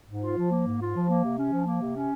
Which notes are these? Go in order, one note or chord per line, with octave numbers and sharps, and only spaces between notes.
G#2
F4
F3
A#3
G#2
F4
F3
A#3
C3
C#4
F3
A#3
C3
C#4